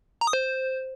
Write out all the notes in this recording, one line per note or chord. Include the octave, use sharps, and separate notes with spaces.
A#5
D#6
C5